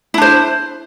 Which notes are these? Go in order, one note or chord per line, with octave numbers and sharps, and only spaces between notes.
D4 E4 C5